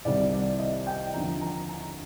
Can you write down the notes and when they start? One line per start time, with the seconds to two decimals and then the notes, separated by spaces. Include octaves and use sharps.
0.05 C2 C3 D#3 G3 D5
0.33 D5
0.60 D#5
0.87 G5
1.14 D#2 D3 F3 A#5
1.41 A#5
1.69 A#5